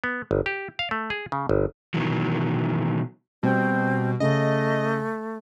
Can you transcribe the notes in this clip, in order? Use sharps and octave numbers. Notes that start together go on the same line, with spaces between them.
B3
G1
G4
F5
A3
G#4
C#3
G1
B2 D#3 E3 F#3
B2 G3 C4
C#3 A3 D#5